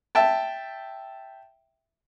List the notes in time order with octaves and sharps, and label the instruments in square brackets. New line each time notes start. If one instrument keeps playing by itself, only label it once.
[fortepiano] E5 G5 A5